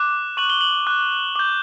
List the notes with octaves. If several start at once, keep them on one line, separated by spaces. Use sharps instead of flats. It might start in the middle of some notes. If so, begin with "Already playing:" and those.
Already playing: D6 F#6
C#6 F#6 F#7
G7
F#7
D6 F#6
D6 G6